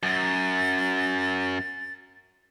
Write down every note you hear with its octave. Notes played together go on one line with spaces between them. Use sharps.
F#2 A6